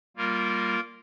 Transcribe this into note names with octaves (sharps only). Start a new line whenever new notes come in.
G3 A#3 F4 A#4